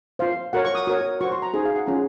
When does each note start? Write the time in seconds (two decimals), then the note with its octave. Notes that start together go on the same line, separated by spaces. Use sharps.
0.19 F4 C5 F5
0.53 F#4 A#4 C#5 F#5
0.65 C#6
0.75 D#6
0.87 F#4 A#4 C#5 D#6
1.21 F#4 C5 C#6
1.32 C6
1.42 A#5
1.54 D#4 G#4 C5
1.65 F5
1.76 F#5
1.87 C#4 F4 G#4 A#5